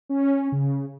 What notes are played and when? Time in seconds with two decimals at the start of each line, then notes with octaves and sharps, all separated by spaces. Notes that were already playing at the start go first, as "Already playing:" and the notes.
0.09 C#4
0.52 C#3